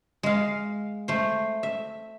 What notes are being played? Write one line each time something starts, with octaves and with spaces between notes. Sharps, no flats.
G#3 F5
A3 C5
E5